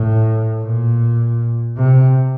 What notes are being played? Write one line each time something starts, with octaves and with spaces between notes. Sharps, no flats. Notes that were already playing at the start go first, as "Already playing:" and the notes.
Already playing: A2
A#2
C3